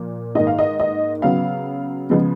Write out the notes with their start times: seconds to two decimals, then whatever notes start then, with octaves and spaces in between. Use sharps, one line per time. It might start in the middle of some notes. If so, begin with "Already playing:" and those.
Already playing: A#2 F3 A#3
0.35 G#2 D#3 A#3 D#5
0.47 F5
0.59 D#5
0.80 D#5
1.22 C#3 F#3 B3 F5
2.10 C#3 F3 G#3 B3